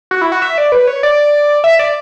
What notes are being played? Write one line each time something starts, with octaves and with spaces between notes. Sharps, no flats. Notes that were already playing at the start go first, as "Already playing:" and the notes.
F#4
E4
F#4
E5
D5
B4
C#5
D5
E5
D5